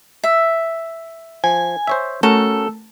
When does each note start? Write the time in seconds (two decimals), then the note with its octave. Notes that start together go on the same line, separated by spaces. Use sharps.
0.24 E5
1.44 F3 G#5
1.87 C5 C#5 E5
2.23 A3 C#4 F#4 A4 A#4